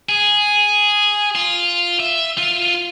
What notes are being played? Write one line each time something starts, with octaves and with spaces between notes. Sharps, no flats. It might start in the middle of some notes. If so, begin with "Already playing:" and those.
G#4
F4
E5
F4